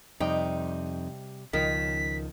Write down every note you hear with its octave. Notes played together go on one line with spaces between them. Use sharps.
F2 C3 G3 D#4 G5
C#2 D#3 F3 A#4 B6